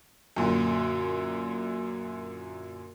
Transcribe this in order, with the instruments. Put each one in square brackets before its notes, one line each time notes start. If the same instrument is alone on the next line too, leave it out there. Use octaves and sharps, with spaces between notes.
[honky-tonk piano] F#2 A#2 D3